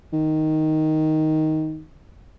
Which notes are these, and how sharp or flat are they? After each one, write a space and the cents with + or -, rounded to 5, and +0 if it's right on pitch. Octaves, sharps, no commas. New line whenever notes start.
D#3 +5